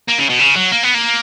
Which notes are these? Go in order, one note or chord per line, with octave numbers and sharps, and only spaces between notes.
A#3
C#3
B2
C#3
F#3
A#3
B3
A#3